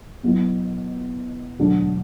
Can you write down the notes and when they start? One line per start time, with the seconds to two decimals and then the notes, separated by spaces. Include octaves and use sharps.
0.23 B1 B2 F#3 B3 E4
1.59 E1 D2 D3 F#3 D4